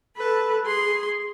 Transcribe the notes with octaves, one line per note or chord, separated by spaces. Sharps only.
A4 B4
G#4 C6